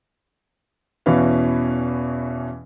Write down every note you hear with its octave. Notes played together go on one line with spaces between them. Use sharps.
E2 B2 E3 C#4 B4 F5